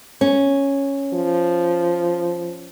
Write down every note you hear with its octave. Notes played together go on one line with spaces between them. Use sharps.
C#4
F3